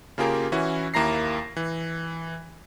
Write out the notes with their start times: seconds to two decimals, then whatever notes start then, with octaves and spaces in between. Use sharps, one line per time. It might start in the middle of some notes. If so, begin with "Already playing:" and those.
0.18 C#3 A#3 F4 G4 G#4 A#4
0.52 E3 C#4 E4 F#4
0.94 D#2 A#3 E4 A#5 A#6 C7
1.56 E3